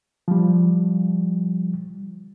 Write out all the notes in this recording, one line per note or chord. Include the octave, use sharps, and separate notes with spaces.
F3 G3